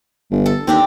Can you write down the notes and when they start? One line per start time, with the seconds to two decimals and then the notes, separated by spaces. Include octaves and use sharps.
0.31 G1
0.46 A4
0.67 D#2 C4 D4 G4